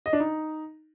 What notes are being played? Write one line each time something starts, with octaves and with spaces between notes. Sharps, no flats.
D#5
D4
D#4